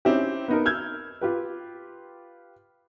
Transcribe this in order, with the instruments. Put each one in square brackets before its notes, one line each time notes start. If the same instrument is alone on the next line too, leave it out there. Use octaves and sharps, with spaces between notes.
[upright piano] C4 C#4 D#4 E4 G4
B3 D#4 A#4
E6 F6 G6 G#6
F4 G4 B4